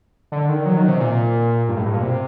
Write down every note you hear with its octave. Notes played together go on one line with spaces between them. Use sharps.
D3
D#3
F#3
D#3
C3
A#2
G2
A2
G2
A#2
C3